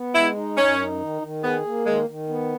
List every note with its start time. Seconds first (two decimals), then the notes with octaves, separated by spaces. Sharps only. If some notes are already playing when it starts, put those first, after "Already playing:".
Already playing: B3
0.14 G#3 E4
0.36 D#4
0.57 F#2 C#4
0.79 D#4
1.00 D#3
1.22 D#3
1.43 B3 G#4
1.65 A#3
1.86 D#3 G#3
2.08 D#3
2.29 B3